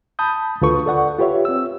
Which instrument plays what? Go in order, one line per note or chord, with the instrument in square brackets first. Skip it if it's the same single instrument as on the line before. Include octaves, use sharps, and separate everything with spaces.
[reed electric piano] A5 B5 D#6 G6
D2 A3 F4 A4 B4 C#6
A4 D5 F#5 C#6
F4 G4 B4 C#5 E5
C4 E6